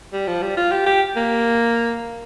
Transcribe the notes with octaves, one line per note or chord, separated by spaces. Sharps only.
G3
F3
G3
F4
G4
G4
A#3